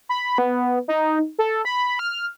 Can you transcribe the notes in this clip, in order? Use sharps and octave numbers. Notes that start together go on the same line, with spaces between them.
B5
B3
D#4
A4
B5
F6